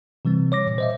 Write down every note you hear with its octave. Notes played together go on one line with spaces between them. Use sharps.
C3 E3 G3 C4
C#5 D6 A#6
A#2
C5 D#5 E5